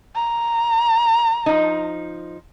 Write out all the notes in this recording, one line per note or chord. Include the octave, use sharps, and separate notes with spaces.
A#5
F3 D#4